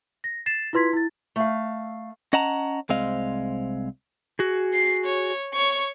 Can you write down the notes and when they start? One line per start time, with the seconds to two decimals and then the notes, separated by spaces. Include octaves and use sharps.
0.24 A#6
0.46 A6 C7 E7
0.73 E4 F4 B4 C6 G#6 B6
0.93 E4 A6
1.36 A3 F5
2.33 C#4 D#5 F#5 A5 A#5
2.90 C2 G#3 C4 D#5 F5
4.39 F#4 G#4
4.74 C7
5.05 C#5
5.53 C#5 C#6